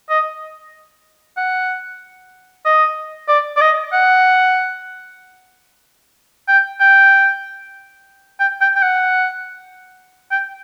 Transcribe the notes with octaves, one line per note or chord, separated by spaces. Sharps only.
D#5
F#5
D#5
D5
D5
D#5
F#5
G5
G5
G5
G5
G5
F#5
G5